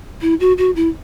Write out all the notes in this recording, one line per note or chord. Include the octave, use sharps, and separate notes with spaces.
E4
F#4
F#4
E4